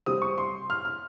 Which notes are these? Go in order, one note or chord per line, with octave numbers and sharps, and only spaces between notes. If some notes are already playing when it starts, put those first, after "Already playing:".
C3 G3 C4 D#6
C#6
C6
F6
F6